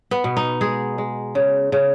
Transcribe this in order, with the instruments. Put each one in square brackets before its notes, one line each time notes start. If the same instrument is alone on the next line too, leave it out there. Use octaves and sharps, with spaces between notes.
[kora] B3
B2
D#4
G#3 G#4
G#3
C#3
C#3